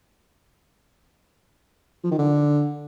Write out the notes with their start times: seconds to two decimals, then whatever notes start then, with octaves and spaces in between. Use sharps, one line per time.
2.04 F3
2.11 D#3
2.19 D3